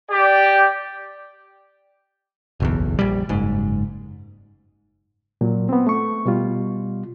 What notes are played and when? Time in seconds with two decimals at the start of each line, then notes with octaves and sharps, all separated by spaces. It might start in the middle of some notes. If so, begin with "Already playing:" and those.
0.10 G4 D5
2.60 F#1 B1 E2
2.99 A#1 G3
3.29 F#1 G#2
5.41 A#2 F#3
5.69 B3 C4
5.87 A3 C#6
6.26 B2 G3 F4